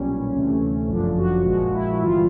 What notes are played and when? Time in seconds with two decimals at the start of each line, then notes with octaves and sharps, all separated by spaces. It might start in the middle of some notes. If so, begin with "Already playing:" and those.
Already playing: B1 A#2 G3 C#4
0.33 D2 C3 E3 A3
0.89 G1 F#2 D3 F3 D4
1.18 F#4
1.45 A#1 A#2 F3 G#3 F#4
1.73 E4
2.01 G1 G2 E3 G3 F4